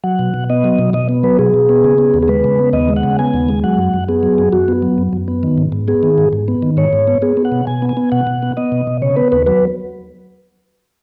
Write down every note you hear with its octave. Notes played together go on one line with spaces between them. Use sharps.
F#3 F#5
B2
B2
B3 D#5
F#3
B2
B2 D#5
B3
F#3 B4
B2 G#4
B2
B3
C#3
B3
D#2
G#4
G#3 B4
C#3
B3
D#2 D#5
G#3
F#5
C#3
B3 G#5
D#2
G#3
F#3 F#5
F#2
F#2
B3 G#4
F#3
F#2
F#2 F#4
B3
F#3
F#2
F#2
B3
D#3
G#2
G#2
B3 G#4
D#3
G#2
G#2
B3
D#3
G#2 C#5
G#2
B3
B3 G#4
B3
F#5
B2
B2 G#5
B3
G#5
B3
B2 F#5
B2
B3
B3 D#5
B2
B2
C#3 C#5
B3 B4
D#2 B4
F#3 B4